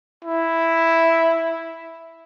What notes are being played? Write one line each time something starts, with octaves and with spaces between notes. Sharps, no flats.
E4